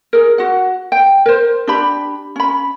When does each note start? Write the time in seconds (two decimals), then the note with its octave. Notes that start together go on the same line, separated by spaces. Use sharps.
0.13 G#4 A#4
0.38 F#4 F#5
0.92 G5
1.26 A#4 C5
1.67 D4 G4 B5
2.36 C#4 B5